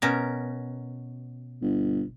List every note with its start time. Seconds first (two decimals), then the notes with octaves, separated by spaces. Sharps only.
0.02 B2 C#4 A#4
1.62 G1